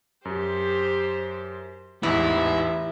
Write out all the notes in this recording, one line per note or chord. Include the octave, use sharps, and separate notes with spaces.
F#2 G4 C5
A1 E2 G#2 E3 E4 G4